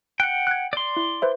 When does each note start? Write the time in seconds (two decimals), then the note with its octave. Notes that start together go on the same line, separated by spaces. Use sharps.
0.20 F#5 G5 F#6
0.47 F#6 G#6
0.73 D5 C6
0.97 E4
1.22 B4 C5 E5